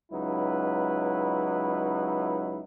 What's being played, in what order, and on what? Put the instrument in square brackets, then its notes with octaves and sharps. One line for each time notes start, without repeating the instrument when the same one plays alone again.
[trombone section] C#2 F#3 D#4 E4 B4